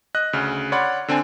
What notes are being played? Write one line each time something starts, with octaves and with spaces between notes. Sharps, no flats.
D#5 F#6
D2 C#3 F6
C#5 D5 F#5 B5 C6
D3 C4 D4 G#5